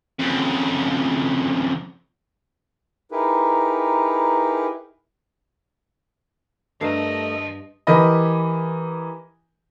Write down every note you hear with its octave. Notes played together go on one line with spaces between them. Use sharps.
F2 C#3
D#4 E4 G4 G#4 A#4 B4
G2 A3 A#4 D#5 F5 A5
E3 G4 A#4 D#5 B5